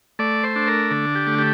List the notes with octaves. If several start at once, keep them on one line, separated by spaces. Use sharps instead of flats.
A3 D5
C5
D4
A#4
D3
G4
A3
G4